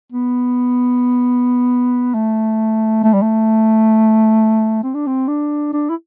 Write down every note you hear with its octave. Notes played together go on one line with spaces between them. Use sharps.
B3
A3
A3
G3
A3
C4
D4
C4
D4
D4
E4